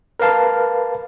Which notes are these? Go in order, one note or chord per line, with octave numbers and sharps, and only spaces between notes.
A#4 B4 F5 A5